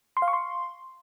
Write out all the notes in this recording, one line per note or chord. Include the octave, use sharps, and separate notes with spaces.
C6
F5
C#6
C6